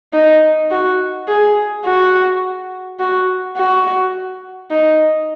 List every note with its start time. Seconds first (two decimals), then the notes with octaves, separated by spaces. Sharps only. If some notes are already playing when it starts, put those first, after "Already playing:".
0.13 D#4
0.71 F#4
1.28 G#4
1.85 F#4
2.99 F#4
3.57 F#4
4.71 D#4